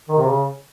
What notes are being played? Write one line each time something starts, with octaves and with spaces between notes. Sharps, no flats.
D#3
C3
C#3